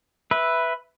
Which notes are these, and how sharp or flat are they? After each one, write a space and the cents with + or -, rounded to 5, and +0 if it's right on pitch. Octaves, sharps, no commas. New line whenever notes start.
B4 +0 E5 +0